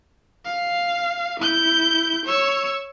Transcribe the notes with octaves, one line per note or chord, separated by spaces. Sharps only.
F5
E4 G6
C#5 E6